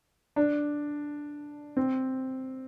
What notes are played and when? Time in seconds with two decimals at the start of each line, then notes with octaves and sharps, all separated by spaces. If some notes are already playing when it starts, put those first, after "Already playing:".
0.36 D4
1.77 C4